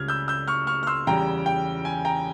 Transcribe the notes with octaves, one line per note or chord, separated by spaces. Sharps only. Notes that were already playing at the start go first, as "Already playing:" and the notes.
Already playing: C#2 C#3 G3 F6 G#6
E6 G6
E6 G6
C#6 F6
C#6 F6
F6
C6 E6
E2 C#3 G3 G5 A#5
G5
G#5
G5 A#5